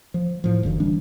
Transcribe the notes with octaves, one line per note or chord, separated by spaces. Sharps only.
F3
A2 F3
F#1 F#2 D3 D#3
E3 G3 D4